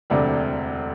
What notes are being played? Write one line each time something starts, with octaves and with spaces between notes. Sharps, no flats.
E1 D2 C3 D4